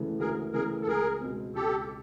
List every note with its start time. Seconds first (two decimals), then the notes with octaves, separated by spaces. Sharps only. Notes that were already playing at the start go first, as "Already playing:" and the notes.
Already playing: D2 C#3 E3 A3
0.20 D2 G#4 A#4
0.53 C#3 E3 A3 G#4 A#4
0.82 A4
0.87 C#2 G#4 A#4
1.21 B2 G#3 C4
1.55 C#2 G4 A4